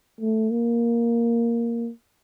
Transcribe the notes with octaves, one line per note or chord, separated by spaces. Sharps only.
A3
A#3